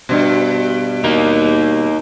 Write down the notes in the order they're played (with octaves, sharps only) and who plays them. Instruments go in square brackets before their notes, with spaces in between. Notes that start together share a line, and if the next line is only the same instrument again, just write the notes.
[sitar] G2 B2
[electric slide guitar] A#3 D#4